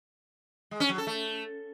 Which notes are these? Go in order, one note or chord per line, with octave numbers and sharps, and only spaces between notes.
G#3
C#4
F#3
A4
A3